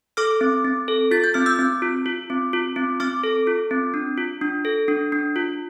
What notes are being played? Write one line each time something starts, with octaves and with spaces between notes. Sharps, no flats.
A4 D6 F6
C4
C4
A4
F4 A6
G6
C4 F6
E6 G6
C4
F4
F4
C4
F4
C4
C4 D6 F6
A4
F4
C4
D4
F4
D4
A4
D4
D4
F4